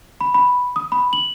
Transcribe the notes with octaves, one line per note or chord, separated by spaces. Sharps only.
B5
B5
D#6
B5
F#7